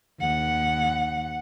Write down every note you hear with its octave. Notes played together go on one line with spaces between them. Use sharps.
D#2 F#5